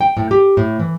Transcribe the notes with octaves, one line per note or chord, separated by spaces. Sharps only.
G5
A2
G4
A2
E3